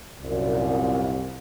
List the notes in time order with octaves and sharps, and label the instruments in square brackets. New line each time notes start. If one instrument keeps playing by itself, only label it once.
[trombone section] C2 [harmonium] F#2 A#2